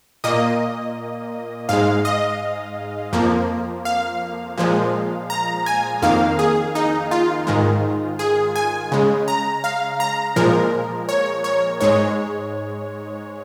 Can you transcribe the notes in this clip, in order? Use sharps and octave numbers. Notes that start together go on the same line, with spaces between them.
A#2 A#3 D#5
G#2 G#3 F5
D#5
F2 F3 A#3
F5
A#2 F3 G#3
A#5
G#5
F2 D#3 A#3 F5
G#4
D#4
F4
G#2 D#3 G#3
G#4
G#5
C#3 G#3
A#5
F5
A#5
A#2 F3 G#3 A#4
C#5
C#5
G#2 G#3 C#5